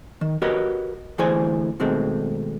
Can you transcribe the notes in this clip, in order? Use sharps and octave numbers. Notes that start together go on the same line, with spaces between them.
D#3
F#4 G4 A#4 B4 C#5 D#5
D2 A2 E3 G#4 C5 G#5
B2 D#3 G#3 A3 C4